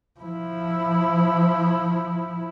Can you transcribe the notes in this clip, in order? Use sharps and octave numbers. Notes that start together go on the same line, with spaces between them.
F3 E4